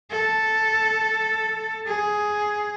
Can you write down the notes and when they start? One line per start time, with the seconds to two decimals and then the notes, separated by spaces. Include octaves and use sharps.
0.11 A4
1.87 G#4